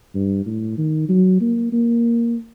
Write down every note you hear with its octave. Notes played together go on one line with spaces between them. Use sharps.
G2
A2
D#3
F#3
A#3
A#3